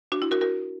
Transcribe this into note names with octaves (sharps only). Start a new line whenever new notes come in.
D4 F#4
E4
F#4 A#4
F#4 A#4